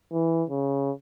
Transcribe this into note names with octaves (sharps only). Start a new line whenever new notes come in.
E3
C#3